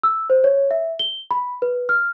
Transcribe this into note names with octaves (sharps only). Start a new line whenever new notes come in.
E6
C5
C#5
E5
G7
B5
B4
F6